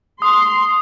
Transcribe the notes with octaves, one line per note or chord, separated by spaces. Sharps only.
C6 D#6